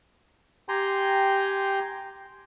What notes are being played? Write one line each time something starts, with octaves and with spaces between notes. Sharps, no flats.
G4 G5 G#5 A#5 C6